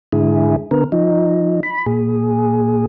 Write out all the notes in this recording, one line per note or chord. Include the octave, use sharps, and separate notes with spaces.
G#2 D3 E4 G#4
D3 B3 A#4
F3 D#4
B5
A#2 G#4